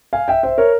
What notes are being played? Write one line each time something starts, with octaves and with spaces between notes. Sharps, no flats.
F5 G#5
E5 G5
C5 E5
A#4 C#5